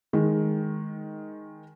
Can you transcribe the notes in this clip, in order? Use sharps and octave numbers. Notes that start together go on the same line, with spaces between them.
D#3 G#3